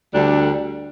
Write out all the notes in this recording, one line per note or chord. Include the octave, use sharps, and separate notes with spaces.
D2 D3 G3 D4